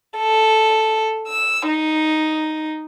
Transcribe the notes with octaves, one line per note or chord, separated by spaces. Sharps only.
A4
E6
D#4